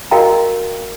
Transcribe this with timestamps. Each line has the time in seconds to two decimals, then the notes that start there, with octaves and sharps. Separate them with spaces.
0.11 F#4 A#4 D#5 F5 G5 A#5